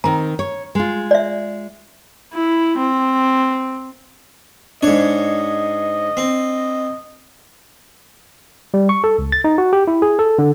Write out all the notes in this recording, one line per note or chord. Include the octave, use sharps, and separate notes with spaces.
D#3 C4 A#5
C#5
G#3 F4
D5 E5
E4
C4
G#2 D4 C#5 D#5
C4
G3
C#6
A4
C#2
A6
D#4
F#4
G4
E4
G#4
A4
D3